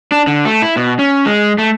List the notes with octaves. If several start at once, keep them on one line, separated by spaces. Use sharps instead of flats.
D4
D3
A3
E4
B2
C#4
G#3
A3